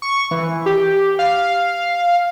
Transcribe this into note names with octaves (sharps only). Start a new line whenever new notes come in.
C#6
E3
G4
F5